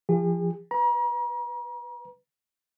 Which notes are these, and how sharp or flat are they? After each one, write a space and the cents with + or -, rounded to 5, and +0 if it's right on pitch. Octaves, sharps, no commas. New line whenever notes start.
F3 -25 G#4 -45
B4 +0 A#5 +40